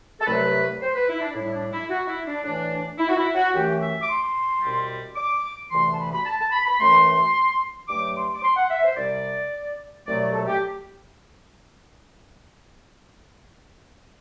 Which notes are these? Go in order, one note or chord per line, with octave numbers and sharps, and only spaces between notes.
A4
C2 C3 F#3 A3 B4
C5
B4
E4
D4
A2 G3 E4
D4
E4
F#4
E4
D4
A2 E3 A3 D4
E4
F#4
E4
F#4
F#2 E3 A3 G4
E5
D6
C6
C2 B2 G3
D6
D2 C3 E3 A3 C6
A5
B5
B5
A5
A5
B5
B5
F#2 E3 A3 C6
G2 F#3 A3 D6
C6
D6
C6
F#5
E5
C5
C2 C3 G3 D5
C2 B2 F#3 A3 D5
D5
A4
G4